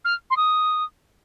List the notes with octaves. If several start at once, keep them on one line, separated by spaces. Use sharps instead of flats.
F6
C6
D#6